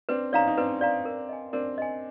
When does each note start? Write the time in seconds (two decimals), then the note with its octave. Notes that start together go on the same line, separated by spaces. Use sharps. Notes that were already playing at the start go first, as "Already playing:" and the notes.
0.09 C4 D4 B4
0.33 C#4 D#4 D5 F5 A#5
0.48 D#4
0.58 C4 D4 B4
0.81 D5 F5 A#5
1.05 A#4
1.29 D#5 G#5
1.53 C4 D4 A#4
1.78 D#5 G#5